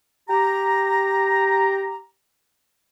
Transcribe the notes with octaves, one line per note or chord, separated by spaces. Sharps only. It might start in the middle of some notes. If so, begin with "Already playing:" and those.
G4 A#5